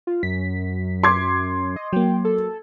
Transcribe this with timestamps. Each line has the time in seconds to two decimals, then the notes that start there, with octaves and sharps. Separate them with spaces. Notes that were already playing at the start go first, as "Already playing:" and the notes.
0.07 F4
0.23 F#2 B6
1.03 C6 D6 G#6
1.76 D#5
1.93 F#3 A#3 G5
2.25 A4